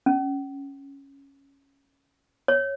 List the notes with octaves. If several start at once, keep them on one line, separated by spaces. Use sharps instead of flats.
C#4
C#5